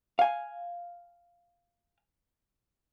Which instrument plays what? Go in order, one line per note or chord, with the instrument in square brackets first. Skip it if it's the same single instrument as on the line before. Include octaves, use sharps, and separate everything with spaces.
[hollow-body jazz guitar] F5 G#5